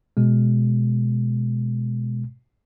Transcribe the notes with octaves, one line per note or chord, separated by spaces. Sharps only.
B2 G#3